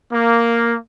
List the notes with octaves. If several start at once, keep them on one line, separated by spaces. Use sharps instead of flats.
A#3